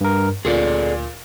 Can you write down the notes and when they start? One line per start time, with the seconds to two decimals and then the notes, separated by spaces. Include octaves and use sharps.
0.01 G2 A#4
0.45 D2 A#2 G#4 A4 D5